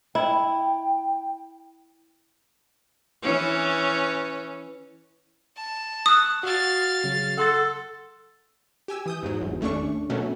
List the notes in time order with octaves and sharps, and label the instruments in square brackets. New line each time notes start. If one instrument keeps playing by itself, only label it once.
[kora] E4 [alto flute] G5
[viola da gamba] E3 C#4
[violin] A5
[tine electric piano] C#6 E6 F#6 [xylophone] D#6
[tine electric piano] F#4 [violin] F5 A6
[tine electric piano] C#3 F#3
[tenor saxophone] A4 [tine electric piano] F#5 C6 A6
[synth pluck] G4 G#5 E6
E3 D#6 G6
E2 G#2 F#3
G1 E2
D#2 A3 C#4 D4 C#6
B2 F#3 A3 A#3 C#4